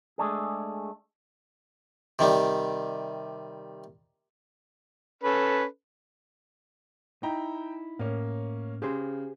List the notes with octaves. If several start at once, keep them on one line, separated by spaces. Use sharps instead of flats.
G#3 A3 D4 G#4
C3 D#3 G3
C#4 A4 B4
D#4 E4 G5 A#5
A2 A#3 C#4
C#3 G4 G#4 C5